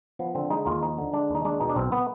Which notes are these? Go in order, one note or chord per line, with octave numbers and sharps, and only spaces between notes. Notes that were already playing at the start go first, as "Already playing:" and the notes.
F3 B3
D3 C4
G#3 D#4
D#2 F4
F3 D#4
D3
G#3 D4
D#2
D#4
G#3 D4
B2 D#4
D4
B1 C4
B3